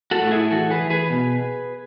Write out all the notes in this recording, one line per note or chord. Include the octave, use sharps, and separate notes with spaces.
F#4 A4
A2
F#4
E4 G#4
E3 F#4 A4
G#4 B4
E3
G#4 B4
B2